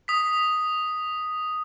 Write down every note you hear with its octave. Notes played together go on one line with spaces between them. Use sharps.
D#6 B6